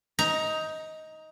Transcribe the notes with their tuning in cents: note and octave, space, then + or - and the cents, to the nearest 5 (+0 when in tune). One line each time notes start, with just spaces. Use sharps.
D#4 +15 A#5 +0